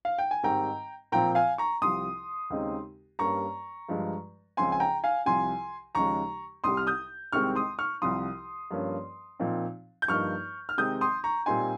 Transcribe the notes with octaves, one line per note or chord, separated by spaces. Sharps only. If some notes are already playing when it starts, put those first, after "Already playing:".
F5
G5
G#5
G#2 D#3 G3 C4 G5 A#5
A#2 F3 C4 G5 A#5
F5 G#5
A#5 C#6
C2 C3 F3 C6 D#6
D#2 C#3 G#3 C4 D#4
G2 G3 A#3 C#4 A#5 C#6
G2 F3 G#3
C#2 C#3 F3 C4 G#5 C6
G#5
G5 A#5
F5 G#5
C2 C3 F3 G#5 C6
D#2 C#3 F3 G#3 A#5 C#6
C2 C3 G3 C6 D#6
F6
D#6 G6
C2 C3 D#3 G#3 C4 C#6 F6
C6 D#6
C#6 F6
C2 C3 F3 C6 D#6
G2 F3 A#3 C#4
A#2 F3 C4 D#4
G6
G2 F3 A#3 D#4 C#6 F6
F6
C3 D#3 G#3 C4 D#4 D#6 G6
C6 D#6
A#5 C#6
A#2 G3 C4 D#4 G#5 C6